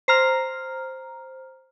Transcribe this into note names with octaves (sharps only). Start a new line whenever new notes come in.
C5 A#5 F6